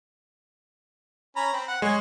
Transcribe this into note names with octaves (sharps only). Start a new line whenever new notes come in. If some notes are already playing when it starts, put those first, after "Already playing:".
C#4 A#5 B5
C4 B5
F#5
G#3 C#5 G#5